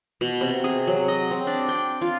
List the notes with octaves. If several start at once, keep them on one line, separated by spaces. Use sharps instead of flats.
B2
C3
G#4
F#3
D#5
C4
D4
G5
F4